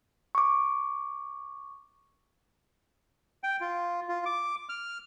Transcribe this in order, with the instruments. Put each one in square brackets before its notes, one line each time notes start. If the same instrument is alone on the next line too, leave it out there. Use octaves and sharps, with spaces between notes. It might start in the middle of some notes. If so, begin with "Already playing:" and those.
[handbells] C#6 D6
[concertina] G5
F4
F4
D6
F6